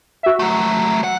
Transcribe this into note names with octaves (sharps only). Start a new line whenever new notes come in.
F#4 E5
F#3 A3
F#5